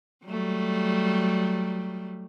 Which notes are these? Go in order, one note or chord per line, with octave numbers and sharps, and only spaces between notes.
F#3 G3 A3